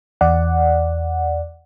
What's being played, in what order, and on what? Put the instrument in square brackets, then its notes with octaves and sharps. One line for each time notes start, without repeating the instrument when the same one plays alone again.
[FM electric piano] E2 D5 F#5